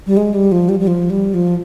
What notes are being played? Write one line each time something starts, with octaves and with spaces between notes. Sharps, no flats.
G3
G#3
G3
F3
G3
G3
F3
G3
F3